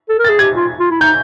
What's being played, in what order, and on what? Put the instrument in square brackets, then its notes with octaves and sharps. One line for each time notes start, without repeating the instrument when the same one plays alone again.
[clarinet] A4
A#4
[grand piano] A6
[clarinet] G#4
[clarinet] G4 [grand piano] G#6
[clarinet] F4
F4
E4
[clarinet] D#4 [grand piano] G6